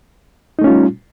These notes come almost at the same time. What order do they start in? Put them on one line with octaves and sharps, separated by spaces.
D#4 A3 C#4 F4 G3